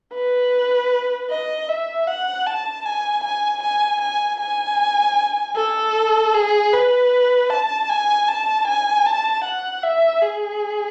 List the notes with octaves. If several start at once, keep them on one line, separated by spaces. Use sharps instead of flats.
B4
D#5
E5
F#5
A5
G#5
G#5
G#5
G#5
G#5
A4
G#4
B4
A5
G#5
A5
G#5
A5
F#5
E5
G#4